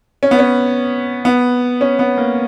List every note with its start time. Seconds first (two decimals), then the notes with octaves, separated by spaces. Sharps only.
0.23 C#4
0.31 B3
0.39 C#4
1.25 B3
1.81 C#4
1.99 B3
2.18 A#3